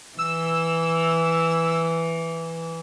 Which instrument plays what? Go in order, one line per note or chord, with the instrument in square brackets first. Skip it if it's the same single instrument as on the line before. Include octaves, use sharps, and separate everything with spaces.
[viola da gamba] E3 [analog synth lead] E6